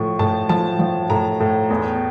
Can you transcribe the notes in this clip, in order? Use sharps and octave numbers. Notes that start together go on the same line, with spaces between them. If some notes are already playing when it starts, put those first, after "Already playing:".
Already playing: A2 F3 C#6
A2 A5
F3 A5
F3
A2 A#5
A2
E2